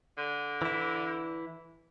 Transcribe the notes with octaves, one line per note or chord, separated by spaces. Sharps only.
D3
E3 E4